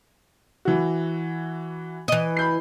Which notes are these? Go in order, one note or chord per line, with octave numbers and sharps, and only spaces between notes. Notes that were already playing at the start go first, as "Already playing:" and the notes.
E3 F#4
E3 D#5
B5 G6 C7